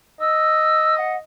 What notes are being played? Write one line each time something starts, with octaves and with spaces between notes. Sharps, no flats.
D#5 E6
F#5